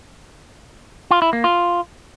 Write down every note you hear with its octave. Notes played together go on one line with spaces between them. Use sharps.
F4
E4
A#3
F4